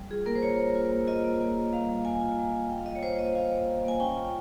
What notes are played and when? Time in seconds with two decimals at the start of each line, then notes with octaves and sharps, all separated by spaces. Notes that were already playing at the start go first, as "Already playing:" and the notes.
Already playing: G3
0.10 F4 G#4
0.26 A#3 A#4
0.36 C5
0.42 F4 C#5
0.59 A#3
0.75 F4
0.92 A#3
1.07 F4 D#5
1.24 A#3
1.41 A#3
1.57 F4
1.73 G3 F5
1.89 G3
2.05 A#3 G#5
2.21 F4
2.38 G3
2.54 G3
2.70 F4 G5
2.78 F5
2.86 A#3 D#5
2.95 C#5
3.03 F4 C5
3.19 A#3 D#5
3.35 F4 F5
3.52 A#3
3.69 F4
3.85 A#3 G#5
4.00 C#4 G5
4.17 F4